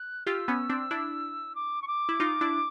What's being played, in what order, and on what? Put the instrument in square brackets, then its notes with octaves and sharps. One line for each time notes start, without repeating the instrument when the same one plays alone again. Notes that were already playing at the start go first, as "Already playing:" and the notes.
Already playing: [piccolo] F#6
[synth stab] F4 G4 [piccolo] E6
[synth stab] B3 C#4
C4 D4
D4 E4
[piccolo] D6
C#6
D6
[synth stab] E4
D#4 F4
D4 E4